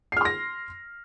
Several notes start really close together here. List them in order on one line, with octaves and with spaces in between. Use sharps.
C7 F6 C6 A#6